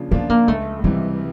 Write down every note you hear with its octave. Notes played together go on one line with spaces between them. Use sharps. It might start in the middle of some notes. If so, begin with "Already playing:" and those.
Already playing: C#3 F3 A#3 D4 F4
F3 A#3 B3 D4 F4
A#3
C#2 A3
C3 E3 G3